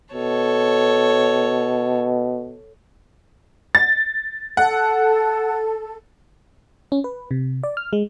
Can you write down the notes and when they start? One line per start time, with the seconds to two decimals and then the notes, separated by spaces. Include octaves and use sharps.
0.14 B2 A4 C#5
3.75 A6
4.57 A4 F#5
6.92 C#4
7.04 B4
7.31 C3
7.63 D5
7.77 F6
7.93 G#3